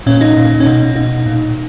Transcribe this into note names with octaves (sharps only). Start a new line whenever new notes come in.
A#2 C#4
D#4
A#2
C#4
B2 D#4
B2 D#4
A#2